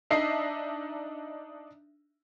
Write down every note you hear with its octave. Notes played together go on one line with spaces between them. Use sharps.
D4 D#4 D#5 E5 C7